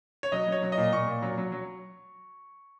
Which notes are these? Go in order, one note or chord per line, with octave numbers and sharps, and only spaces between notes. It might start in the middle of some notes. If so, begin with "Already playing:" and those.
C#5
F#3 D#5
F#3
C#5
F#3
D#5
A#2
A#2 C#6
A#2
F#3
F#3
F#3